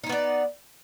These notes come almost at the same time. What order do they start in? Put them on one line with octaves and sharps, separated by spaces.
D#4 E4 B3 D5